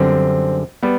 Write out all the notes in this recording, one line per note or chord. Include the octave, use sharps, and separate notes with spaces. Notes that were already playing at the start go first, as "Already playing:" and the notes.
Already playing: F#2 D3 G3 C4
G3 B3